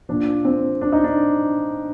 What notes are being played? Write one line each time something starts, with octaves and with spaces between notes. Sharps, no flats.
A#2 F3 D4
C4
D4
D#4
D4